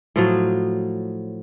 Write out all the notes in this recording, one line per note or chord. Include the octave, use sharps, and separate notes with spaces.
A2 F3 F#3